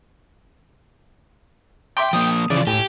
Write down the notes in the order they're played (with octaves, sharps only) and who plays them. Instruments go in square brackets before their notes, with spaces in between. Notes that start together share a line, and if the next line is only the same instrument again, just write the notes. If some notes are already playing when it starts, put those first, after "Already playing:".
[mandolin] E5 C6 D6 [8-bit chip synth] G5
[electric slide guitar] F3 A#3 [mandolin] D#6
[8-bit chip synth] C#3 D5 [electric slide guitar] E3 F3
[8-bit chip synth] A2 [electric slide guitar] G4 [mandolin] G#5